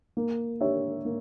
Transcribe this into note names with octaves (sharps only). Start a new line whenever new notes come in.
A#3
D4 G4 C#5 E5
A#3